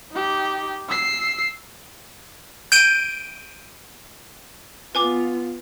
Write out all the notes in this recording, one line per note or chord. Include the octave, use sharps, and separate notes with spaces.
D#4 G4
E6 C7
G6 D7 D#7
B3 F4 B4 G#5 D6